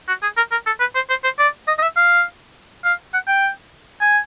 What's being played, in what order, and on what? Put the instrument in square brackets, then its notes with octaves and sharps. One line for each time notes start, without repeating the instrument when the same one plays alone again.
[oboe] F#4
G#4
A#4
A#4
A4
B4
C5
C5
C5
D5
D#5
D#5
E5
F5
F5
F#5
G5
G#5